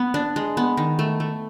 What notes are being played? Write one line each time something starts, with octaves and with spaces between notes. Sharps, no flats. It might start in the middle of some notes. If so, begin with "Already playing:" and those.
Already playing: B3
D4
G#3
B3
D#3
A3
A3